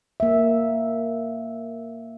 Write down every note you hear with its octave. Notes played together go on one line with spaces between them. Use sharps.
A#3 E5